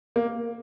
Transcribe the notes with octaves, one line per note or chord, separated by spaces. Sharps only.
A#3